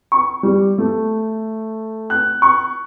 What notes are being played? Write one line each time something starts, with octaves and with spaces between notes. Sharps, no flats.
C#6
G3
A3
F#6
C#6